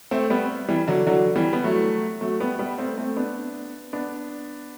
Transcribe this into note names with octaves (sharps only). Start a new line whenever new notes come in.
A3 C4
G3 B3
E3 G3
D3 F#3
D3 F#3
E3 G3
B3
F#3 A3
F#3 A3
G3 B3
G3 B3
A3 C4
A3 C4
B3 D4
B3 D4